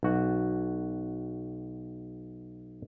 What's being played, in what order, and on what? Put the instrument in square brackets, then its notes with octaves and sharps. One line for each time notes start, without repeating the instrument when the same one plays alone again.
[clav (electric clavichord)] B1 F#4